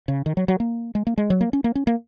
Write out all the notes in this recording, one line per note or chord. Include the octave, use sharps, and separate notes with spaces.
C#3
D#3
F#3
F#3
A#3
G#3
A#3
G#3
F#3
A#3
C#4
A#3
C#4
A#3